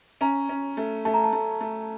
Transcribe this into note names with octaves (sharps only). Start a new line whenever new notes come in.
C#4 A#5
C#4
A3
A3 A5
A#5
A5
A3
A3